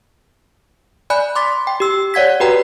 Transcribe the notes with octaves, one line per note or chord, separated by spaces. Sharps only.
D5 G#5 B5 F#6
C6 D6 A6 B6
G5
G4 E6
C#5 D5 F#5 G#6 B6
F#4 G4 B4 G5 A#5